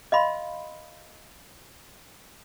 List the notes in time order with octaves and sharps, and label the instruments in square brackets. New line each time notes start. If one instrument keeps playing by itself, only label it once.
[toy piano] D#5 F5 B5 C6